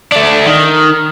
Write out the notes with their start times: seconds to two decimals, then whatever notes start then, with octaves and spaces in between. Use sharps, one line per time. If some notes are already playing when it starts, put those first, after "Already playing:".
0.12 A3 D4
0.46 D#3